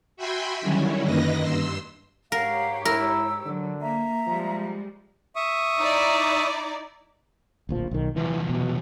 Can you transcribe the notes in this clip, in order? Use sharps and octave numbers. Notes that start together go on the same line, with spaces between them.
F#4 E5 G5 G#5 B5 C6
D3 D#3 F#3 G3 C#4 E4
F#2 D#3 A#3 B4 D#5 A#6
G2 C6 E6
G#2 G4 A#4 C#5 F5 F#5
E4 A#4 E6
D3 F#3
A#3 E5 A#5
F3 G3 G#3
E5 C#6 D#6
D#4 E4 D5
D1 A#1 F3
B1 D#3
E2 C3 E3
B2